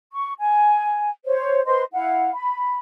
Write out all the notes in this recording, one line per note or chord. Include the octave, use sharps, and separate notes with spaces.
C#6
G#5
C5 C#5
B4 C5 D#5 C6
E4 F5 F#5
B5